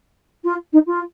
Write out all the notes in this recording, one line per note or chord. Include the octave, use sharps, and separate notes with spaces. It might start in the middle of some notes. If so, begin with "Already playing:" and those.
F4
D#4
F4